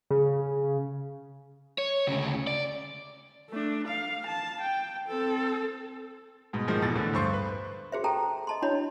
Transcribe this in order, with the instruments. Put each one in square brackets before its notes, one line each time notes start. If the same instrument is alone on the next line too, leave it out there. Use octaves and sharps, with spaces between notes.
[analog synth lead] C#3
[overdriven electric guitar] C#5
D2 C#3
D5
[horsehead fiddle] A3 D4
F5
A5
G5
C4 A4
[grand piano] G#2 B2
A#2 D#3 F3 G#3
E2 B2 A4 A6
A2 D3 E3
G2 C5 C#6
B4
[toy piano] F#4 G#4 C5 E5
G4 A4 G5 A5 A#5
D#5 A5 C6
D4 E4 F#4 C#5 D#5 B5